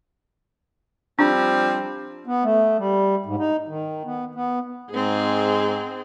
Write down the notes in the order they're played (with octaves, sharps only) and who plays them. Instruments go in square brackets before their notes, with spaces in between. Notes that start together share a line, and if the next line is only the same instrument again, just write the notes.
[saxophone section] F3 G3 C4 [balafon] D4
[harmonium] B3
A3
G3
G#2
D#4
D#3
B3
B3
[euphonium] G#2 [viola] C4 G#4